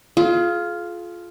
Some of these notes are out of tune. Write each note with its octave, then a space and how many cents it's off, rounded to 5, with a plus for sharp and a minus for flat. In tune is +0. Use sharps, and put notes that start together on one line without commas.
F4 +0 G#4 +40